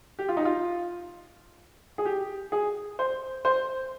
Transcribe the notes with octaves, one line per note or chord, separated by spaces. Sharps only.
G4
F4
D#4
F4
G#4
G4
G#4
C5
C5